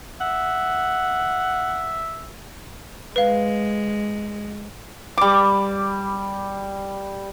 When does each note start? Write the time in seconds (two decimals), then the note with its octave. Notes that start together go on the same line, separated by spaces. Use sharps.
0.20 E5 F#5
3.16 G#3 B4 F5
5.18 G3 D6